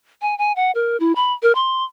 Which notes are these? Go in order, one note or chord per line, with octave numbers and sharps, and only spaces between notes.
G#5
G#5
F#5
A#4
E4
B5
A#4
C6